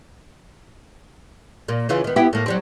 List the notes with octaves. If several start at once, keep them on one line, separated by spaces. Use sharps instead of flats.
A#2 A#3
C#3 E3 F4
D#3 B3
B3 E4 G4
A2 A#3
F#3 G3 C4